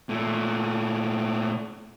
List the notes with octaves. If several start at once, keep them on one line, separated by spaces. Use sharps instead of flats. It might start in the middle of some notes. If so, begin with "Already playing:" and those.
A#2 A3